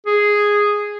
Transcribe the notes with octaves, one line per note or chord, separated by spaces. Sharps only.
G#4